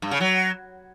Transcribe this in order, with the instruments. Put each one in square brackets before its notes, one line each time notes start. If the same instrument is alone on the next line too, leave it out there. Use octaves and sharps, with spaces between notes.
[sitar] G2
C#3
F#3